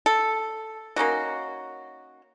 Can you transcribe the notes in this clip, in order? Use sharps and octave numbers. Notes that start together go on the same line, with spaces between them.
A4
A#3 C#4 D#4 F#4